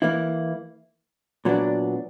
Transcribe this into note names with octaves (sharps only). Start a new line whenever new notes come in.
E3 A#3 E4
A#2 F#3 B3 D4